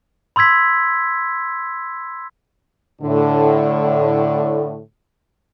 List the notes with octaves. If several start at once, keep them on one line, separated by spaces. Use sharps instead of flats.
B5 C6 E6 G#6 B6
A2 D3